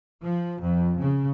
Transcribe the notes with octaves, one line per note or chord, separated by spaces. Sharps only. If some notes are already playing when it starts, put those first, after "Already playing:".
F3
F2
C#3